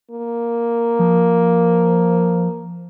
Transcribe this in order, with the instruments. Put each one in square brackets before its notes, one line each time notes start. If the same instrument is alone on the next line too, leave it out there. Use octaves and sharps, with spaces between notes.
[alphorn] A#3
[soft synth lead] F3